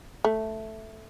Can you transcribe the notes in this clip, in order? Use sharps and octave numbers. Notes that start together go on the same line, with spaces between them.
A3